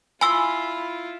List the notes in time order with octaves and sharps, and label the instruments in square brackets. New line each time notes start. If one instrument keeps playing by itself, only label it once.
[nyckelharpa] E4 F4 [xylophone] G#5 E6 [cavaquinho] B5 C6